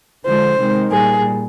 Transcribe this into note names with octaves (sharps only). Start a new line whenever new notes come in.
D3 F3 G#3 C5
C3 D#3 G#3
A#2 G3 G#4